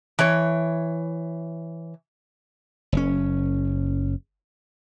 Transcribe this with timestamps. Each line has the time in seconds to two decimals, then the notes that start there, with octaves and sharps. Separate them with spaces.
0.19 E3 C#5
2.92 F#1 C#4